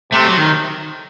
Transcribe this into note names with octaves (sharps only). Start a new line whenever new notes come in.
C3 A3
F#3
D#3